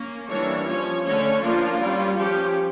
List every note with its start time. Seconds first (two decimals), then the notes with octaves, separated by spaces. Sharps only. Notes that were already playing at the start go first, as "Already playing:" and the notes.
Already playing: A#3 C#4
0.28 E3 G3 A#3 D4 C#5
0.66 F3 C#4 C#5
1.04 D3 A3 C#4 C#5
1.42 F3 A#3 D4 F4
1.80 G3 C#4
2.18 F3 C#4 G4